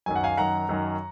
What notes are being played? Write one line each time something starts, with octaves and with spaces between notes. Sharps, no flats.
F#2 D#3 F#3 G#5
F#5
F5 G#5
F#2 D#3 F#3 F#5 A#5
F#2 D#3 F#3